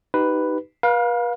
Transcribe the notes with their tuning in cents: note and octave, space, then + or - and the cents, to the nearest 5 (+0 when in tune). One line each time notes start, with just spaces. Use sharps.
D#4 +0 G4 -25 B4 +5
B4 -40 F5 +20